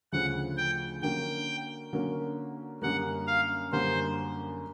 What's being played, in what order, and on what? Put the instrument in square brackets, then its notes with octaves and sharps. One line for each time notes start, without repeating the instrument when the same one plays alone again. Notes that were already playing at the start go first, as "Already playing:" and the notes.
[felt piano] D2 C#3 F3 [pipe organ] F#5
[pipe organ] G5
[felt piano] D3 F#3 A#3 C#4 [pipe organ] G5
[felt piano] D3 F#3 A#3 C#4
[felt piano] F#2 D3 G3 A#3 [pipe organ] F#5
[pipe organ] F5
[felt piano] F#2 D3 G3 A#3 [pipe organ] C5